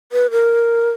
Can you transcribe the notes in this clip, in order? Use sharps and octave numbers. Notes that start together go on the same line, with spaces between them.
B4
A#4